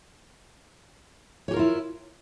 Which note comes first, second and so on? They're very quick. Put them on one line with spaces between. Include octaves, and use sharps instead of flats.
C#5 G4 A#4 F4 E4